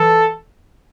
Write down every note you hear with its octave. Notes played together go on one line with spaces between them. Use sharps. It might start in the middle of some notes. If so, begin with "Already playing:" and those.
Already playing: E3 A4